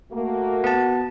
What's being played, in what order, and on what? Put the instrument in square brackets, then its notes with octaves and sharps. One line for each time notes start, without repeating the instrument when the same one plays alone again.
[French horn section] A3 A#3 [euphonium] F#4
[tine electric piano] B3 A5